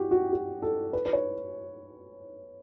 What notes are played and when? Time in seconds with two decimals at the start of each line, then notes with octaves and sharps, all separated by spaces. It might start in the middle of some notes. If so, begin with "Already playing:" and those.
Already playing: F#4 G4
0.11 F#4
0.32 G4
0.62 A4
0.93 B4
1.06 B4
1.13 C#5